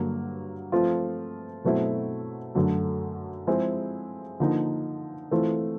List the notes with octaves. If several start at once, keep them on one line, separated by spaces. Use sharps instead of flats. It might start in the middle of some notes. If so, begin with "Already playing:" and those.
Already playing: G2 D3 F#3 A#3
F3 A3 C4 F4
B2 F#3 A3 C4 E4
F#2 D3 F#3 A3
F3 G#3 C4 E4 G#4
D3 F3 A#3 D#4
E3 A3 C4 F4